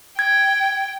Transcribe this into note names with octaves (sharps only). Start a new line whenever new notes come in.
G5 G#6